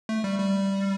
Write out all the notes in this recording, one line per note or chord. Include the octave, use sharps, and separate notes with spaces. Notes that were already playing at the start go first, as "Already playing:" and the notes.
A3
G3
G3